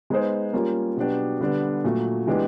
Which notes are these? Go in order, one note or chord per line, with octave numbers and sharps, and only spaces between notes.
G#3 B3 D#4 G#4 C5
G3 A#3 C#4 F4
B2 F#3 B3 D4 G4
D3 G3 B3 D4
A#2 F#3 A3
E3 G#3 B3 D4 G4